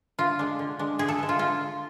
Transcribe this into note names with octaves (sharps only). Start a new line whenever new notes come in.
D3 F4
G#3 D4
D3
G#3 D4
D3 G#4
A4
G#3 B3
F4
D3 F4